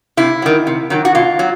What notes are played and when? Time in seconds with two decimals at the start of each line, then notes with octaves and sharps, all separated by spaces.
0.17 C3 E4
0.42 D#3 F#3
0.67 C3
0.90 D#3 F#3
1.05 F#4
1.15 B2 F4
1.39 F#3